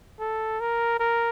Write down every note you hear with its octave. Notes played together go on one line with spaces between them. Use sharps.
A4
A#4
A#4